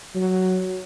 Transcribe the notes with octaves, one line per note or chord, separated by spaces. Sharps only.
F#3